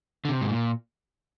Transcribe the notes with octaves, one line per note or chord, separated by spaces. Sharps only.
D3
C3
G#2
A#2